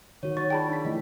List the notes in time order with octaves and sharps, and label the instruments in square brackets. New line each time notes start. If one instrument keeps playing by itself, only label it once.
[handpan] D#3 F#4 [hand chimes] C#5
[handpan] F#4 [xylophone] C#5 C#6 [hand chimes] A6
[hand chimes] F4 G#4 D5 [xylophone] G5 A5 B5
[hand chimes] D4 B6
[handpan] E3 A3 [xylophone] D#5